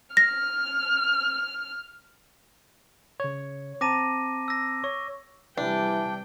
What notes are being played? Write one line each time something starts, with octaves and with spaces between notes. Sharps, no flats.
F6 A#6
C#3 C#5
C4 A5 A#5 D6 A#6 D#7
E6 A#6
C#5 C#6
C3 E3 G3 D4 G5